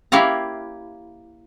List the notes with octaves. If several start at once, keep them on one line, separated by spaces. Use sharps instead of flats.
A#3 E4 G4 C#5 F5 A#5